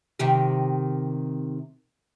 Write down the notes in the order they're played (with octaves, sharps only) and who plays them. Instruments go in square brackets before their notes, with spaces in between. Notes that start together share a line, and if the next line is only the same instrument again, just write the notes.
[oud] C3 D#3 G4